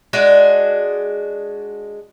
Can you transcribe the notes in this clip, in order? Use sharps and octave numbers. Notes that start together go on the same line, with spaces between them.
G#3 D4 F#4